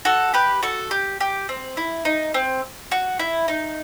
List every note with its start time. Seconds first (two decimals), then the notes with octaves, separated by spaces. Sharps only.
0.05 F#4 A4
0.34 G4 B4
0.63 F#4 A4
0.91 G4
1.21 G4
1.49 C4
1.77 E4
2.05 D#4
2.34 C4
2.91 F#4
3.19 E4
3.48 D#4